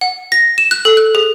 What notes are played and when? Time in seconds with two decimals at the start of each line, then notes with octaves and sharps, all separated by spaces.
0.01 F#5
0.32 A#6
0.58 E7
0.71 F#6
0.85 A4
0.97 F#6
1.15 G#4